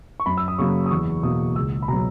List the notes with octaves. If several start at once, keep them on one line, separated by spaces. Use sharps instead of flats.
C#6
F#2 B5
E6
D#6
C#3 F#3 A#3 C#6
D#6
E2 C#6
B2 A#3 D#6
C#2 E6
B5
B2 F#3 A#5